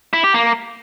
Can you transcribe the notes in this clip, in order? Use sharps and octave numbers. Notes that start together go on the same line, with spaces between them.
E4
G4
A#3